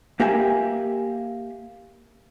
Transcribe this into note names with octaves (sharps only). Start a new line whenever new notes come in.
A#3 G4 A#4 E5 G#5